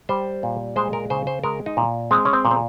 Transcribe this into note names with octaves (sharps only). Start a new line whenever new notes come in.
G3 C5
A#2
G#3 C5
A#4
C#3 C5
C5
G#3 A#4
D#4
A#2
G#3 C4
C#4
C4
A#2
C4